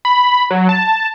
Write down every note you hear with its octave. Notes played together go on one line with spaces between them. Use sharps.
B5
F#3
A5